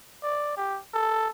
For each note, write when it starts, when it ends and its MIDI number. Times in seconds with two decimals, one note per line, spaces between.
0.23 0.54 74
0.57 0.80 67
0.94 1.29 69